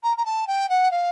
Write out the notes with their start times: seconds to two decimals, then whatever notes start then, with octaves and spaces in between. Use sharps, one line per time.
0.03 A#5
0.17 A#5
0.25 A5
0.47 G5
0.69 F#5
0.91 F5